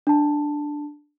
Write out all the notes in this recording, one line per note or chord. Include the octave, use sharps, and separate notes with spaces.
D4 A5